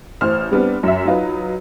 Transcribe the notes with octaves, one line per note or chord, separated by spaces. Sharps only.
A1 C5 F6
G3 B3 C4 D4
F#2 E5
F#3 D#4 F4 B4